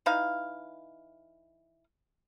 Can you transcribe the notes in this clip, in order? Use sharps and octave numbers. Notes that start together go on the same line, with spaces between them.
E3 D#4 F5